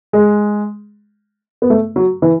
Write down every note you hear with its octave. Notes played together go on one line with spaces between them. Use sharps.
G#3
B3
A3
F#3
E3